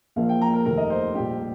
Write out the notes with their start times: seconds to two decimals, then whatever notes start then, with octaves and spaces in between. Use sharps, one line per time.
0.16 A#1 A#2 F3 A#3 F5
0.29 G5
0.41 A#5
0.53 A#4
0.66 F1 D#2 D#3 A#4
0.77 D#5
0.90 C5
1.14 A#1 A#2 G3 G4